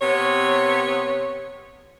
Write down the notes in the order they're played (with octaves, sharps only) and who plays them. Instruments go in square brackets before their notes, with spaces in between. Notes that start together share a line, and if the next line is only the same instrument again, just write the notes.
[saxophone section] C3 B3 C#5